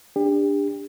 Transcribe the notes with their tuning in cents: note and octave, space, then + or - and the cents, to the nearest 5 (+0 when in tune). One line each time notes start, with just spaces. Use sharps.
D4 +0 G4 +35